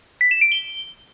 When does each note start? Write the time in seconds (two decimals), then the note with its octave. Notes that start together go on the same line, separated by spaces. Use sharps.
0.21 B6
0.31 E7
0.41 D7
0.52 G7